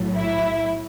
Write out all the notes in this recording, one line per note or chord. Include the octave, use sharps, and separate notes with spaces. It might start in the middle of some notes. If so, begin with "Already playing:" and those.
Already playing: B1 A2 F#3
E4